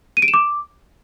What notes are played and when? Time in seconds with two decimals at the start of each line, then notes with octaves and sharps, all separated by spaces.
0.17 D#7
0.22 D7
0.28 E7
0.34 D6